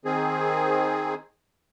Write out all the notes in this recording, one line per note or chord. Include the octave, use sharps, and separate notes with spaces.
D#3 C4 G#4